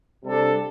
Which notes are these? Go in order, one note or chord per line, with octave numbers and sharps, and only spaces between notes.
C3 G3 D4 A4